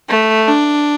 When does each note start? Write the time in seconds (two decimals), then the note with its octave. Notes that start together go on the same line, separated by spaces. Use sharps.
0.09 A3
0.48 D4